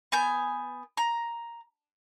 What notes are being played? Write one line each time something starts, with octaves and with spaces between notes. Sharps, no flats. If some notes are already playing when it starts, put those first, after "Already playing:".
B3 G#5 G6
A#5